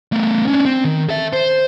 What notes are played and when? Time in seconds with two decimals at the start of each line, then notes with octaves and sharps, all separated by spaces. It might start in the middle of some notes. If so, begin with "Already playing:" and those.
0.12 A3 B3
0.47 C#4 D4
0.65 C4
0.85 D#3
1.09 A4 E5
1.33 C5